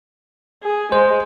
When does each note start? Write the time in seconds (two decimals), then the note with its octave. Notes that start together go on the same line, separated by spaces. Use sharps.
0.63 G#4
0.92 G#3 C5